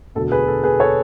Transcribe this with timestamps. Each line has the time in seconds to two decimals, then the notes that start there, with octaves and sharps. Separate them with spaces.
0.15 E1 D2 D3 F#3 A4
0.32 G#4 B4
0.47 A4
0.63 G#4 B4
0.80 A4 C#5